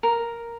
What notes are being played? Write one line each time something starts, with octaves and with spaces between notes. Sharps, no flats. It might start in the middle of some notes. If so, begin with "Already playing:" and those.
A#4